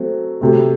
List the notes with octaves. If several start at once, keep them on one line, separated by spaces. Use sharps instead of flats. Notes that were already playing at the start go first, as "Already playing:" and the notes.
Already playing: F#3 A3 C4
C3 F#3 A3